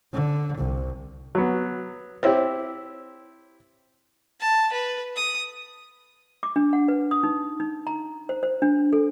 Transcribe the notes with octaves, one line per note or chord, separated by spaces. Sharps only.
D3
C2
F#3 B3
C4 E4 G4 C5 C#5
A5
B4
D#6
D6
D4
F#5
B4
D#6
D#4
D#4
A#5
C5
C5
D4
A4